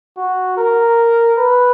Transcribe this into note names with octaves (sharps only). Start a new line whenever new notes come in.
F#4
A#4
B4